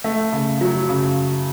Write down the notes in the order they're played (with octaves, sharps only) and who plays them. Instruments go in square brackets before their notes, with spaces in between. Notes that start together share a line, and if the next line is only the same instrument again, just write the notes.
[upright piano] A3
C#3
F#3
C#3